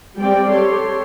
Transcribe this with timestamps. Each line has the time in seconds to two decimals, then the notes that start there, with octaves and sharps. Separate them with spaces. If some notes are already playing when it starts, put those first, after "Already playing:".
0.17 G3 C4 D5 G5
0.50 G4 A4 C#5 C6